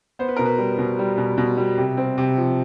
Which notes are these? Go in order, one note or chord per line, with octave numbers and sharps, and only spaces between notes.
B3 C5
B4
B2 A#4
B4
G3
B2
G3
B2
B2
G3
C3
C4
C3
F3